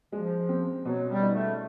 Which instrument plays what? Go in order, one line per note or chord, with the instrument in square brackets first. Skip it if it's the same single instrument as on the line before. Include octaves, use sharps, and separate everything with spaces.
[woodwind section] F3 [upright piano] G#3
[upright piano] C4
[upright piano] B2 [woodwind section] F#3
[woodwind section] G3
[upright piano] D#4
[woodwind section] A3